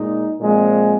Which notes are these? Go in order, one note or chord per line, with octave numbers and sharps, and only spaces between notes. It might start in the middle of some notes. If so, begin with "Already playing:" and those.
Already playing: A#2 G#3 D#4
A#2 F3 G#3 C4